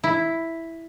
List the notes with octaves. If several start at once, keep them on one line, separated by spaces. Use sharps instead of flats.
E4